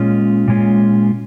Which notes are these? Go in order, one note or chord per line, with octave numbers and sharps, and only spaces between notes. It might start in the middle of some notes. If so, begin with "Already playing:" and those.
Already playing: A#2 G#3 C#4 F4
A#2 G#3 C#4 F4